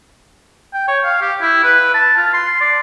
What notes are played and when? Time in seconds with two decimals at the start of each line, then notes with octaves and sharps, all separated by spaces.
0.74 G5
0.88 C#5
1.04 F5
1.21 G4
1.41 E4
1.64 B4
1.94 A5
2.17 F4
2.34 C6
2.61 D5